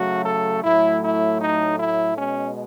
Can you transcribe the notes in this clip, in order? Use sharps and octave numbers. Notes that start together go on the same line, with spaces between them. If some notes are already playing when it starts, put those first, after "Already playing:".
Already playing: C#3 F#3 A3 F#4
A4
A2 F#3 A3 E4
E4
D#4
E4
B2 G#3 C#4